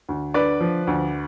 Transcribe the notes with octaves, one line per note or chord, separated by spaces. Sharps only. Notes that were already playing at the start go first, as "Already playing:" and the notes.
D2
D3 B4 D5
F3
D2